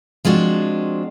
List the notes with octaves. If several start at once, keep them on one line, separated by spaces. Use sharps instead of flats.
F3 G#3 C4 D4 F#4